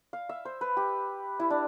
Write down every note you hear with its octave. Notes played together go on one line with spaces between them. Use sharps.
F5
E5
C5
B4
G4
E4
D4